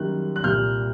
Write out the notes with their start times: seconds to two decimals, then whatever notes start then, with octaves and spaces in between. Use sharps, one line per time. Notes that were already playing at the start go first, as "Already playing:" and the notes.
Already playing: F#2 D#3 G3 A#3 F#6
0.36 F#6
0.43 C2 A#2 G3 A#3 F6 G6